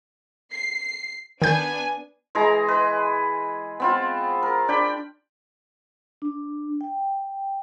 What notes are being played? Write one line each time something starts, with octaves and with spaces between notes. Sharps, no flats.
C7
D#3 B3 D4 G#5 G6
E3 G#3 G#4 A#5
B4
B3 C4 F4
A#4
D4 G5 B5
D4
G5